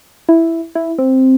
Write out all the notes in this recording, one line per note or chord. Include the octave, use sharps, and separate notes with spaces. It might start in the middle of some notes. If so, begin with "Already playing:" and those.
E4
E4
C4